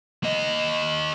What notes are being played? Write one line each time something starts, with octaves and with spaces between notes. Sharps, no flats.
A#3 D#5